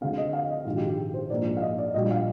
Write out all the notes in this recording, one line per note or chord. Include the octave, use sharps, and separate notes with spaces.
D2 D3 G#3 C4 F5
D#5
F5
D#5
A#1 G#2 D#3 F4
G4
G4
C5
A#1 G#2 F3 A#3 D5
F5
D#5
D5
A#1 A#2 G3 D#5
F5